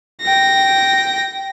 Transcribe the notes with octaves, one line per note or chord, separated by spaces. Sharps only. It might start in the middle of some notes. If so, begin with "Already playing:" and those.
G5 A#6